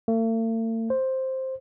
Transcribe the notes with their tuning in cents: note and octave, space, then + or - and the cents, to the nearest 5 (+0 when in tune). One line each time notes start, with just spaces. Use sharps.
A3 +45
C5 +5